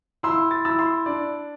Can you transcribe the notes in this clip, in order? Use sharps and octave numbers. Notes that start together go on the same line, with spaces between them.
E4 C6 E6
A6
E4 E6 A6
C6 E6
D4 D5